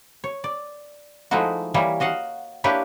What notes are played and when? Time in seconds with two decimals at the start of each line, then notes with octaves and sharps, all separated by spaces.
0.24 C#5
0.44 D5
1.31 F3 G#3 A3 D#4 E4 F#4
1.74 E3 G3 A#3 E4 C#5
2.00 F#4 D#5 F5 F#5
2.64 A#3 D4 E4 G4 B4 C#5